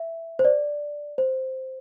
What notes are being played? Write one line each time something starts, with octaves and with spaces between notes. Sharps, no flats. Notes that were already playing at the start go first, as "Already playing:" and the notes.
Already playing: E5
C5
D5
C5